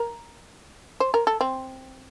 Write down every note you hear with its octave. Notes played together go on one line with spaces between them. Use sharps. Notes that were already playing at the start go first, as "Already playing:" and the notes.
Already playing: A#4
C5
A#4
A4
C4